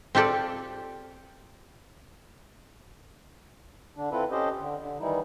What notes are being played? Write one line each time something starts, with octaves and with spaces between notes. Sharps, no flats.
C4 F4 G4 A4 D5
D3 D4
C4 E4 F4 A4 B4
C#4 G4 A4 C5 D#5
D3
D3
D#3 E3 G3 D#4 E4